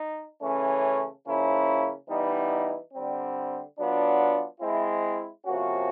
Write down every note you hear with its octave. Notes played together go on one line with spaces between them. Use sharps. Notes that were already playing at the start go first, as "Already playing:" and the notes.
Already playing: D#4
C#3 E3 A3 C#4
C#3 F3 A#3 C#4 E4
E3 G3 B3 D#4
D3 G3 C4
F#3 B3 D4 F4
G#3 C4 E4
C3 F3 A#3 C#4 F#4